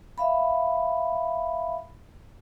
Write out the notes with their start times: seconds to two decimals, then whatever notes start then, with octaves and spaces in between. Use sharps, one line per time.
0.18 E5 F5 B5